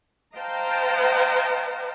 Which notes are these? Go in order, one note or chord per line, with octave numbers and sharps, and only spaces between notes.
C5 D#5 F5 G5 A5 A#5